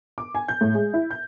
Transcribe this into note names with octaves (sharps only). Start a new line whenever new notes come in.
D6
G#5
G6
A2
G#3
E4
G6